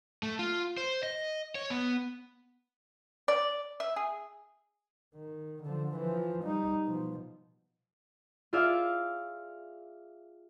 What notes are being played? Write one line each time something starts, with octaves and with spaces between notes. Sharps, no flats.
A3
F4
C5
D#5
C#5
B3
D5
E5
G#4
D#3
D3 F3
E3 F3
G3 D#4
B2 F3
F4 G#4 D5 E5 F5